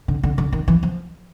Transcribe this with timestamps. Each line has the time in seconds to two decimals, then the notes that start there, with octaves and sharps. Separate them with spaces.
0.08 D3
0.23 D3
0.38 D3
0.53 D#3
0.68 E3
0.83 F3